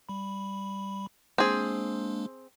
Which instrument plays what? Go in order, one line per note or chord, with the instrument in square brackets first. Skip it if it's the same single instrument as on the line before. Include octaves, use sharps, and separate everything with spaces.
[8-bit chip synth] G3 B5
[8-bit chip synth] G#3 A#3 D4 [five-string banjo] C4 G#4